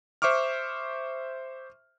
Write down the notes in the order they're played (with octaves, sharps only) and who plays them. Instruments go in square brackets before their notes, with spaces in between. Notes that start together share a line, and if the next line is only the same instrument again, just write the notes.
[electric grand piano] C5 E5 C#6 D6 F6